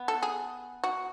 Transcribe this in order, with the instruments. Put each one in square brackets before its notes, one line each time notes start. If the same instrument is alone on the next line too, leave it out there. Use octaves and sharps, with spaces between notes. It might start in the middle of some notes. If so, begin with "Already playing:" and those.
Already playing: [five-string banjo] B3
[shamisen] A4
G#4
F#4